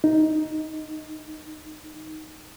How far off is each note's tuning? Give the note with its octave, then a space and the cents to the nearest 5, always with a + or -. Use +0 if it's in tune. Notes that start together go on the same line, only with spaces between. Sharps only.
D#4 +5